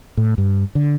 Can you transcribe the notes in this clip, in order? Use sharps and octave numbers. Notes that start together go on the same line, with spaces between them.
A2
G2
D3